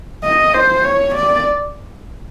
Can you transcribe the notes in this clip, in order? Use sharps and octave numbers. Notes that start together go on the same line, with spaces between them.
D#5
C5
C#5
D5